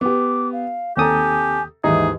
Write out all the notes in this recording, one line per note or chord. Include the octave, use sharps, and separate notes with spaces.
B3 G4 D6
F5
D#2 C3 G4 A4 G#5 A#5 D#6
D#2 G#2 E3 D#4 G#4 E5